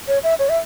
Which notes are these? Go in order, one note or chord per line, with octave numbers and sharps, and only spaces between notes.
C#5
E5
C#5
E5